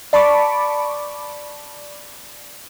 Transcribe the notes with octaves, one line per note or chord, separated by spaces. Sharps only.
D5 A5 B5 C#6 D6